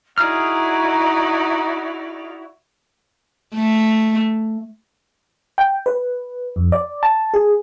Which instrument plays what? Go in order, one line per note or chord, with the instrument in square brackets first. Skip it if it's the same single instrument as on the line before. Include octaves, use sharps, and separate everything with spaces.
[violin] D#4 D5 [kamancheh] E4 F#4 [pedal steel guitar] G#4 F6 [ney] A#5
[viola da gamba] A3
[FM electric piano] G5
B4
F2
D5
A5
G#4